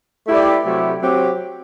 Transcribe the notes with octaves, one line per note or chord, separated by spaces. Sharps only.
A3 E4 G4 B4 D5
C3 F#3 A3 E4 G4
F#3 C4 G4